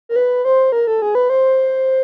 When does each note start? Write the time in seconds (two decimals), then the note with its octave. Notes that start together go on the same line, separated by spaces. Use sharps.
0.09 A#4
0.16 B4
0.45 C5
0.72 A#4
0.87 A4
1.02 G#4
1.15 B4
1.30 C5